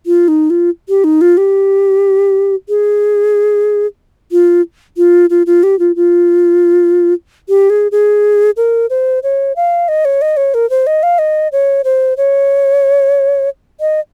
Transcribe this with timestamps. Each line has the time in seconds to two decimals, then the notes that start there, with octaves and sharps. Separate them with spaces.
0.06 F4
0.28 D#4
0.50 F4
0.89 G4
1.04 D#4
1.21 F4
1.37 G4
2.69 G#4
4.32 F4
4.97 F4
5.30 F4
5.46 F4
5.63 G4
5.79 F4
5.96 F4
7.49 G4
7.70 G#4
7.92 G#4
8.57 A#4
8.90 C5
9.23 C#5
9.56 F5
9.88 D#5
10.05 C#5
10.22 D#5
10.37 C#5
10.54 A#4
10.70 C5
10.87 D#5
11.03 F5
11.19 D#5
11.52 C#5
11.84 C5
12.17 C#5
13.80 D#5